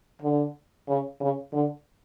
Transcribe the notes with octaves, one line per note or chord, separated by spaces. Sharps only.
D3
C#3
C#3
D3